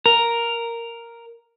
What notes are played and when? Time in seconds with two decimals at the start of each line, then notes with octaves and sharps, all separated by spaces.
0.06 A#4